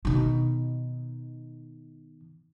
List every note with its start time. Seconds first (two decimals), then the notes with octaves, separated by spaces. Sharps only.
0.05 B2 D#3